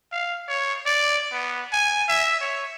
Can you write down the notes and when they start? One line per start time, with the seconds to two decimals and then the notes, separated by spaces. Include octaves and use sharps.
0.12 F5
0.48 C#5
0.86 D5
1.32 B3
1.72 G#5
2.08 E5
2.40 C#5